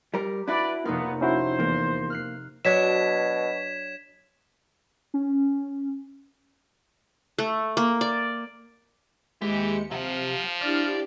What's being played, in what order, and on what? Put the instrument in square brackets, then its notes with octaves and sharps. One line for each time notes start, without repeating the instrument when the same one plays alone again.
[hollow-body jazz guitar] G3 A#4 [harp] D6
[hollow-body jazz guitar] D4 E4 F#4 [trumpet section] B4 D5
[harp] F1 D#4 F4 [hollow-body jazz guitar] A#3 [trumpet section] B3
[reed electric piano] C#4 E4 F#4 [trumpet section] C5
[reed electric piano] E2 [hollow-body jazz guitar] A#3
[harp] F6 F#6 C7
[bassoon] B2 [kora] F#3 D4 [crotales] G#6 B6 E7
[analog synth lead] C#4
[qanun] A3
A#3
D5
[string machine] D#2 C#7 [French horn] E3 [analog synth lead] G#3 [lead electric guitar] G4
[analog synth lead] C3 [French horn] F3 [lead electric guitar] F#3 F#5 [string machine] F5
[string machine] D4 E4 G4 [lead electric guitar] D5 [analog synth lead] F6